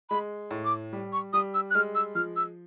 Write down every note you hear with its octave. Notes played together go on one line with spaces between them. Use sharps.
G#3 B5
A2
D6
G3
C#6
G3 D#6
E6
F#6
G#3 F6
E6
F3 F6
E6